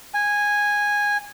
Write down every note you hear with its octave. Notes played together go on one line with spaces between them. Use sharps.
G#5